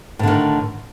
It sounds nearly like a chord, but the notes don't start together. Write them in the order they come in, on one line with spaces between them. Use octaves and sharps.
A2 D3 D#3